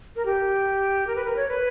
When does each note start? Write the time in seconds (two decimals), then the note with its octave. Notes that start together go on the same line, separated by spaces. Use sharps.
0.16 A#4
0.25 G4
1.07 A#4
1.16 B4
1.25 A#4
1.36 C#5
1.49 B4